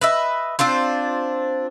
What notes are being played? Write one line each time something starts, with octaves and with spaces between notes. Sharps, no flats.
B4 D#5 E5
C4 D4 F4 C5